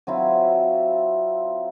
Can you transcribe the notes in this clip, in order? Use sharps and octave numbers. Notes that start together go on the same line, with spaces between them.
F#3 C4 E4 F4